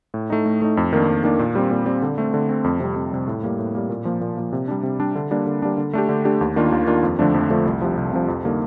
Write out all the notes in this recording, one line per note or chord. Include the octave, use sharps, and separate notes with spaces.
A2
A3 D#4
A2
A3 D#4
F2
D#3 A#3 D4
F2
D#3 A#3 D4
A#2
G3 C4
A#2
G3 C4
D3
A3 C4
D3
A3 C4
F2
C3 G3
F2
C3 G3
A2
G3 A#3
A2
G3 A#3
A#2
F3 A#3
A#2
F3 A#3
C3
G3 D4
C3
G3 D4
D3
G3 A#3 D4
D3
G3 A#3 D4
D3
A3 D4 G4
D3
A3 D4 G4
D#2
D#3 A#3 D4 F4
D#2
D#3 A#3 D4 F4
F2
D3 F3 A3 D4
F2
D3 F3 A3 D4
C2
C3 F3
C2
C3 F3
F2
D3 G3 A#3 D#4